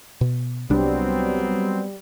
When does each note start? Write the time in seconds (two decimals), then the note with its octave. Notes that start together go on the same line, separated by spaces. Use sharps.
0.21 B2
0.70 C2 F#3 G3 B3 C4 D4